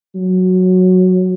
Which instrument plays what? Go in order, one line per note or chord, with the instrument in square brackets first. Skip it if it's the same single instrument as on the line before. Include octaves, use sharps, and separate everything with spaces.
[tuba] F#3